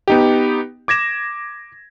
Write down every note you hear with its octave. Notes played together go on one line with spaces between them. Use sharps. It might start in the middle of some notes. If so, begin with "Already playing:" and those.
B3 D#4 G4
D6 G#6 A#6 E7